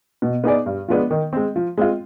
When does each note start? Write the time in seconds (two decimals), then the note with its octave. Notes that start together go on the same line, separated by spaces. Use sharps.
0.22 B2
0.44 B3 D#4 G#4 D5
0.66 G2
0.88 F3 G#3 B3 D4
1.11 D#3
1.33 G#3 C4
1.56 F3
1.78 G#3 C4 F4